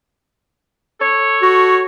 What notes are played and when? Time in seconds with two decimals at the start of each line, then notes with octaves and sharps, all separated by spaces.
1.01 A4 C#5
1.42 F#4